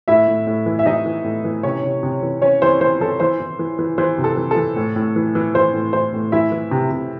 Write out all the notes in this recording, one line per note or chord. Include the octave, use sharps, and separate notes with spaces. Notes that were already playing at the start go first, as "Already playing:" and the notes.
A2 E4 E5
A2
A2
E3
E5
E3 D#4 D#5
E3
A2
E3
C3 C#4 C#5
C3
C3
E3
E3 C#4 C#5
E3 C5
E3 C5
E3 A4
E3 C5
E3
E3
E3
E3 C5
C3
A4
E3
A4
E3
A2
A2
E3
E3
E3 C5
A2
E3 C5
A2
E3 E4 E5
E3
C3
C3